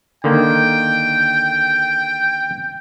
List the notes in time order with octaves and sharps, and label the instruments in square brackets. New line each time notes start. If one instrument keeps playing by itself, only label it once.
[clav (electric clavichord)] D3 D#3 A#3 [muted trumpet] G5